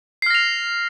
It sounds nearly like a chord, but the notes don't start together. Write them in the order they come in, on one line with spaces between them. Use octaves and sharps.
C7 F6 A#6 F7